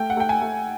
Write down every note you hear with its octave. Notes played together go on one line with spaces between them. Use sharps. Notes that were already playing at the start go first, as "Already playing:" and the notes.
Already playing: A3 G5
F#5
A3 G5
G#5
A3